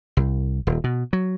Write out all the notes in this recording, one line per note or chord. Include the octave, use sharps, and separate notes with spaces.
C2
D#1
B2
F#3